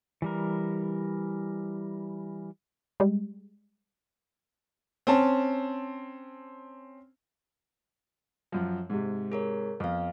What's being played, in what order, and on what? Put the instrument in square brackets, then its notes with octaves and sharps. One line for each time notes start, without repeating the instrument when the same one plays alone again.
[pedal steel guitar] E3 G3 A#4
[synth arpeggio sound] G3 G#3
[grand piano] C4 C#4 A5
[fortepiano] F#2 F3
G#2 C3
[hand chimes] G#4 A#4 C#5
[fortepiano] F2 [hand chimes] B3 F5